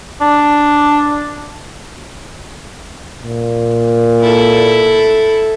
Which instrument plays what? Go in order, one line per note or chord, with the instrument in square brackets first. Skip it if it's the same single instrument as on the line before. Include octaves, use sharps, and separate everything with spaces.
[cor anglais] D4
[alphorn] A#2
[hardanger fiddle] E4 A4